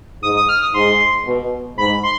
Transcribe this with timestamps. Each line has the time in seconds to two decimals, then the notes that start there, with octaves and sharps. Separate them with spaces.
0.23 G#2 D#6
0.36 D#6
0.49 F6
0.62 D#6
0.74 G#2 C6
1.26 B2
1.78 G#2 B5
2.03 C6